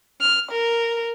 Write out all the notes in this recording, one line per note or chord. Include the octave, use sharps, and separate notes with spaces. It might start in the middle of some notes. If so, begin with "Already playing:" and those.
F6
A#4